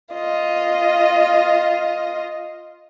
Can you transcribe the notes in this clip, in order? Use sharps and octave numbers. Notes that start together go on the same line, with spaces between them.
F4 D#5